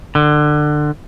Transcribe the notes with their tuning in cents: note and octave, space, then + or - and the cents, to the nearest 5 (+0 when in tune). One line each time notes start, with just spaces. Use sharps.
D3 +25